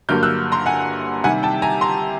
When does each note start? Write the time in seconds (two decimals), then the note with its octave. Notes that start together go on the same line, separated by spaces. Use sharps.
0.09 G2 D3 F#3 A#3 F6 G6
0.23 E6 F#6
0.52 A#5 C6
0.66 F#5 G#5
1.24 C3 D#3 G3 F#5 G#5
1.43 G5 A5
1.62 G#5 A#5
1.81 A#5 C6